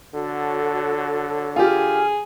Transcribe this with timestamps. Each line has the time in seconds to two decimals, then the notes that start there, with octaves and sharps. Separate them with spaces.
0.14 D3 F#4 A4 C#5
1.56 F4 G4 G#4 G#5 F6